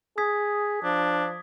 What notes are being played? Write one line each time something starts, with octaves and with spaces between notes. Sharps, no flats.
G#4 D#6 G#6 B6
F3 D4